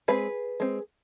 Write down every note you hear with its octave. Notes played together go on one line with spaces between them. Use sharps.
G#3 C4 G#4 B4
G#3 C4